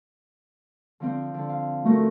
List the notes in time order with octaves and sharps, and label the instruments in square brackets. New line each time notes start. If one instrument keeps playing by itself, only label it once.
[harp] D3 F3 C4
D3
F5
[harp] F3 F#4 A#4 [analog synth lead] A3